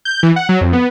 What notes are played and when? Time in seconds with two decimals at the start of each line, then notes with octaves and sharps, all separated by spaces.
0.05 G6
0.23 E3
0.36 F#5
0.49 F#3
0.61 F2
0.73 B3